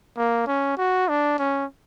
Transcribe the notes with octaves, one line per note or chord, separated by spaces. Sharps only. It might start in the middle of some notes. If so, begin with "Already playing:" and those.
A#3
C#4
F#4
D4
C#4